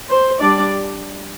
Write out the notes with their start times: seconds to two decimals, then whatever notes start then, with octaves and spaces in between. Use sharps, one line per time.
0.10 C5
0.40 G3 D4 D5